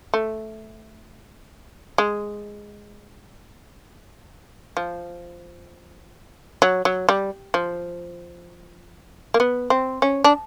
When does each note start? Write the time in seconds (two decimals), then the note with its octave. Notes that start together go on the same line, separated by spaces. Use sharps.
0.14 A3
1.98 G#3
4.77 F3
6.62 F#3
6.85 F#3
7.09 G3
7.54 F3
9.34 A#3
9.40 B3
9.70 C4
10.02 C#4
10.24 D4